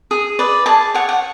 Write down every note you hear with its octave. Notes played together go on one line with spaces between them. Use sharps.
G#4
B4 D5
G#4 A5
C#5 F#5
F#5